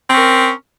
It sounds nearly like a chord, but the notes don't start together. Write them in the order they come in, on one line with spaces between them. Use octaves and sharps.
C4 C#4 A#4